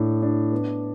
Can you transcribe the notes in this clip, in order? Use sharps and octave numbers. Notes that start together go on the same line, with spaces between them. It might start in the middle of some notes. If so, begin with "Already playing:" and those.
Already playing: A2 D4
D4
B3